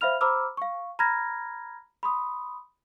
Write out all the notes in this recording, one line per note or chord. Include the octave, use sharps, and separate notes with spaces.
C5 E5 F5 B5 F6 F7
C5 A#5 B5 D6 E6 F6
F5 C#6
A#5 B5 F6 G#6 A#6
B5 C6 D#6